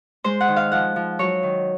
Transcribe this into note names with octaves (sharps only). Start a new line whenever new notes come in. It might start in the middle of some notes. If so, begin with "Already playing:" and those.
G#3 C5
F#5
D#3
F5
F3 F#5
F3
F#3 C#5
D#3